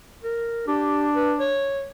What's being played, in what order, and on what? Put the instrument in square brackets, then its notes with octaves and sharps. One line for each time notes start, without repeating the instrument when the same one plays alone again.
[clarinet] A#4
[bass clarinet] D4 [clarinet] G4
[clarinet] B4
C#5